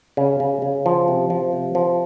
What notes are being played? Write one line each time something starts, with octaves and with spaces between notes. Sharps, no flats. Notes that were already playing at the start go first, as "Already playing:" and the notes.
C#3
C#3
C#3
F3
C3
F3
C3
F3